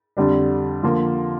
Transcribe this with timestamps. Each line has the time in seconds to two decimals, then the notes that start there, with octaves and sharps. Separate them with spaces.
0.17 F2 D3 G3 D4
0.83 D3 F3 A#3